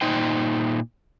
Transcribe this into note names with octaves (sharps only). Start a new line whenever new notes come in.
A#2 D#4 C5 G5